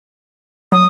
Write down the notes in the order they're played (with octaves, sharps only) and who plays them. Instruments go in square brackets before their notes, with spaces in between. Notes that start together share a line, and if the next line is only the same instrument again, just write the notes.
[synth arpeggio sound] F#3 [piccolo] D#6